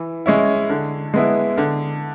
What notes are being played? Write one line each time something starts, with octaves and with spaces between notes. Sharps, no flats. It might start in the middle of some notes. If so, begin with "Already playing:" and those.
Already playing: E3
G#3 C#4 E4
D3
G#3 B3 E4
D3